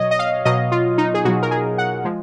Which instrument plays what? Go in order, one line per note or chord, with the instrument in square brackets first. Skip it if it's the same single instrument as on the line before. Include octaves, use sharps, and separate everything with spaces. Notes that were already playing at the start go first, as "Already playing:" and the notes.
Already playing: [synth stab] B2 F#3 C#5 D#5
D#5
F5
B2 F#3 D#5
F4
D#4
G#4
B2 F#4
F#3
A#4
G#4
F#5
F3 G#3